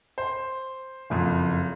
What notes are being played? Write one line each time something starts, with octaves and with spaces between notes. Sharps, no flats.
C5
F#1 F2